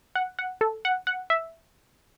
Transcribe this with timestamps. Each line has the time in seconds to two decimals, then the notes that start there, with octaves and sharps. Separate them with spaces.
0.15 F#5
0.39 F#5
0.61 A4
0.85 F#5
1.07 F#5
1.30 E5